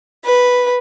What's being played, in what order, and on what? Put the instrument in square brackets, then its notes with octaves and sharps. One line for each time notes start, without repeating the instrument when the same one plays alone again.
[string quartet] B4